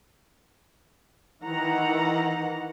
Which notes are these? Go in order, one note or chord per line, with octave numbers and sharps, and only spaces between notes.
D#3 E3 F#5 A#5